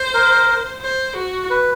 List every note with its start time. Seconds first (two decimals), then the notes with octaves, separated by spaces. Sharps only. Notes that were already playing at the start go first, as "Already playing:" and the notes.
Already playing: C5
0.14 A#4
0.81 C5
1.16 F#4
1.50 B4